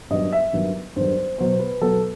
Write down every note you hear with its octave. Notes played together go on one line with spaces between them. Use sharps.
G2 D#3 F#3 B3 D#5
E5
G2 D#3 F#3 B3
G2 D#3 F#3 B3 C5
B2 F#3 B3 C5
B4
B2 F#3 B3 A4